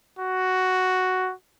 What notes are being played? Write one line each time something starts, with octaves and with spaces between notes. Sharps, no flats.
F#4